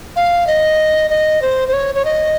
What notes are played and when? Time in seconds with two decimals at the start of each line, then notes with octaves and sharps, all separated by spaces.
0.16 F5
0.47 D#5
1.10 D#5
1.42 C5
1.69 C5
1.73 C#5
1.95 C#5
2.05 D#5